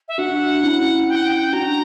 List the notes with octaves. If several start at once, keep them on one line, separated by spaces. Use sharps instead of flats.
E5
D4 F#4 F#5
C#4 E4
G5
F#5
G5
D4 F#4 A#5